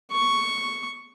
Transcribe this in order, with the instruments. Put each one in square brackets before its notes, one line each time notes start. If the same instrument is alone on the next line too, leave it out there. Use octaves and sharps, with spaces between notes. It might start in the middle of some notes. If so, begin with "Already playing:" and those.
[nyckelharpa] C#6